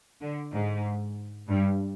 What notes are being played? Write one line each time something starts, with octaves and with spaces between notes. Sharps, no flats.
D3
G#2
G2